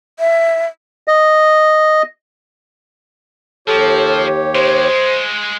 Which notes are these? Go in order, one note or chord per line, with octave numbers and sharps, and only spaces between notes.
E5
D#5
D#2 F3 G4 A4 C#5
G#3 F4 C5